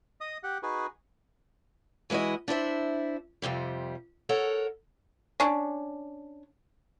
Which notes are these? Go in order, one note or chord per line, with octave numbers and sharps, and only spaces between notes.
D#5 D#6
G4 F#5
D#4 F#4 G#4 B4
E3 G#3 E4 F#4 D#5
D4 E4 C5 E5
F2 G#2 C3 G3
A4 A#4 C#5 F#5
C#4 D4